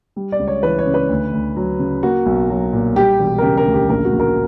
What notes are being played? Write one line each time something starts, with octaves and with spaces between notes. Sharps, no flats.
G3
D5
C#2
C#5
E3 B4
C#5
C#3
B4
D2
D2
F#3
C#3
A#3 F#4
B1
F#3
A#2
G3 G4
E1
A#4
C#3 G4
A#4
D2
G4
A#1 A#4
F#4
A#1
A#4